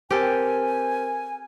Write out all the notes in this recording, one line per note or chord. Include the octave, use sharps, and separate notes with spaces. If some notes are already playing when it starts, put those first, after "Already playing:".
C4 G4 A4 A#4 C5 G#5